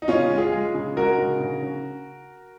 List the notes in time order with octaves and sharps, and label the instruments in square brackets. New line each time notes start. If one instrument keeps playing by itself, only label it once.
[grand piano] D#4
C#3 C#4 F4
G#3
F4 G#4
G#3
C#3
G#3 F#4 A#4
C#3
C#3
C#3